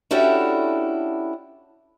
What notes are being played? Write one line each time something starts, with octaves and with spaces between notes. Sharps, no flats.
C#4 D4 E4 F#4 G4 A4